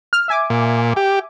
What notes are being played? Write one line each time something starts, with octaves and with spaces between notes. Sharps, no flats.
F6
E5 G#5 D6
A#2
G4